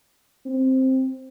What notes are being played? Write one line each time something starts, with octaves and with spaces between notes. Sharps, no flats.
C4